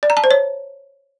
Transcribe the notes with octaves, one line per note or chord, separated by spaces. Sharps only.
D5
A#5
A5
C5
C#5